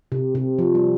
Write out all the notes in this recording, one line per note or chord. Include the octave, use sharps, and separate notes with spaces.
C3
C3
F3
G3